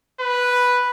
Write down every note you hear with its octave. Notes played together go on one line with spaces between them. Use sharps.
B4